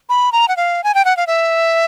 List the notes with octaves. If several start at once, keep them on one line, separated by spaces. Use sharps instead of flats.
B5
A#5
F#5
F5
G#5
G5
F#5
F5
E5